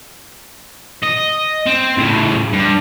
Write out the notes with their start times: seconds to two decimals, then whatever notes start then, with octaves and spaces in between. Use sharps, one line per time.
1.03 D#5
1.67 C4
1.97 A2 C#3
2.53 G2